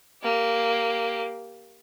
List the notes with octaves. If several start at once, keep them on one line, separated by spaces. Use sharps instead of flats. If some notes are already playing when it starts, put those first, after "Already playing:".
A#3 G4